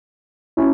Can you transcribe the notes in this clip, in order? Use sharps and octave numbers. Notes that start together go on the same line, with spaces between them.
C#4 E4